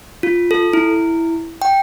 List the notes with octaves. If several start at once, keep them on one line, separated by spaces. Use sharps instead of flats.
F4
A4
E4
G5